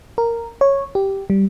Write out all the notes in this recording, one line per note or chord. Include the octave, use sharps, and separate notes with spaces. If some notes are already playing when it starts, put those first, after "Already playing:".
A#4
C#5
G4
G3